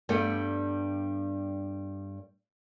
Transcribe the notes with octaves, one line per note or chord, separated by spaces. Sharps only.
G2 G3 A3 B3